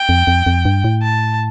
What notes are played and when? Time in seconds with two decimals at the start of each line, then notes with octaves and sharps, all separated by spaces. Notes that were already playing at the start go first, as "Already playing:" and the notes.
Already playing: G5
0.09 F2
0.27 F2
0.46 F2
0.65 G2
0.84 A2
1.02 A5